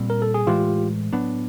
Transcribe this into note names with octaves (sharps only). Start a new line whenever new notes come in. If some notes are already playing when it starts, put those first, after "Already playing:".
Already playing: A#2 G3 C4
A#4
A4
G#4
A2 E3 G#3 F4 G4
A2 F#3 B3 D4